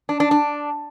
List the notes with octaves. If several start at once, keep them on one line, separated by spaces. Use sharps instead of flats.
D4
D4
D4